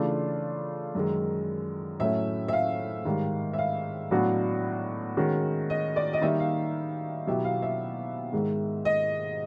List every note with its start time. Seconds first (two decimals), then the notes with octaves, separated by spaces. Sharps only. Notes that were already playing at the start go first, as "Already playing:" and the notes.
Already playing: C#3 E3 A3 D4 F4
0.95 F#2 D#3 G#3
2.00 A2 F#3 A3 C#4 E5
2.48 E5
2.53 F5
3.05 G#2 D#3 G3
3.53 E5
3.58 F5
4.11 A2 F#3 B3 D4 F#4
5.17 D#3 G#3 C#4 F#4
5.70 D#5
5.96 D5
6.13 D#5
6.22 D#3 G3 A#3 D#4 E5
6.40 F5
7.27 B2 F#3 B3 E4 G4 E5
7.44 F5
7.62 E5
8.33 G#2 D#3 G#3
8.85 D#5